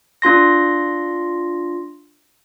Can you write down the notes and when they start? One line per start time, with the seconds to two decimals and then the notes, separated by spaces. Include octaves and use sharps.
0.22 D4 F4 C6 A#6